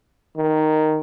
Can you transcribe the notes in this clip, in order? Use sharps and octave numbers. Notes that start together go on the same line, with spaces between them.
D#3